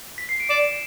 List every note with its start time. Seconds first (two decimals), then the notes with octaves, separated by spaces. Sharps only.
0.18 B6
0.29 C7
0.40 D7
0.49 D5 E7